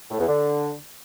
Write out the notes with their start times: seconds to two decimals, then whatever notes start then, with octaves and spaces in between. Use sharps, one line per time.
0.11 A2
0.19 E2
0.28 D3